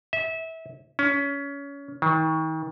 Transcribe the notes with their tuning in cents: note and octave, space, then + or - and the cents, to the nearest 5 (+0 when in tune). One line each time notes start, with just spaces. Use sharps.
E5 -25
C#4 +25
D#3 +40